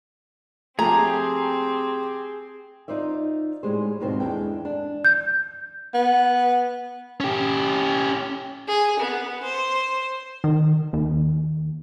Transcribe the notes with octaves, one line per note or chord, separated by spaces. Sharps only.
F3 A3 C4 G4 G#4 A#5
D#4 F4 C5 D5 E5
A2 G3 G#3 G#4 C5
D#2 G#2 B2 C4 C5
E2 G#3 D4 A4 G5
D4
G6
B3
C#4 G4
G#4
B3
C5
D#3
D#2